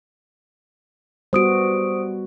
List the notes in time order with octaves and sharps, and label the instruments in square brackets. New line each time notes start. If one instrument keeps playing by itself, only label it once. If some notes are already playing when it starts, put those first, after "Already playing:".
[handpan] G3 B3 F#4 [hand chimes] C5 D#6 D7